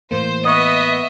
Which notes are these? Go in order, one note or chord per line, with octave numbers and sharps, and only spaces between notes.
A2 E3 A#3 C5
B3 D#5 E5 C#6 D#6